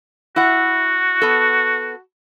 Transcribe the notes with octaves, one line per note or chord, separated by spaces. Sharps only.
E4 F#4 F#5
B3 A4